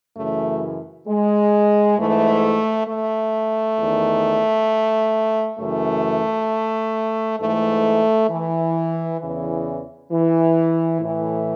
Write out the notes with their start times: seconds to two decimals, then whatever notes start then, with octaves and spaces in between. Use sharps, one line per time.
0.17 F#2 C#3 E3 A3
1.08 G#3
1.98 G#2 E3 A3
2.88 A3
3.78 E2 D#3
5.59 F#2 C#3 E3 A3
7.40 G#2 E3 A3
8.30 E3
9.21 E2 C#3 E3
10.11 E3
11.01 A2 E3